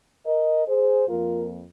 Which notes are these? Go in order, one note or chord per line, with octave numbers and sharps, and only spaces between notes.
A#4 D#5
G#4 C5
F2 F3 A#3 F4 A#4